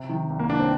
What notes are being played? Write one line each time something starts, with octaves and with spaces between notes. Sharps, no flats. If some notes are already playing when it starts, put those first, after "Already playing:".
Already playing: C3
D#3
C2
A#3
C2 D4
C4